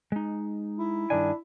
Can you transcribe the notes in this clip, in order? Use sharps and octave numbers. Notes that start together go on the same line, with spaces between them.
G#3 D#4
E4
G2 D#3 D4 G#5